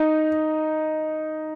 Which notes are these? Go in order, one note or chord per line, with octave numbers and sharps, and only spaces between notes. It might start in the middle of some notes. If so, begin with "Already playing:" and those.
Already playing: D#4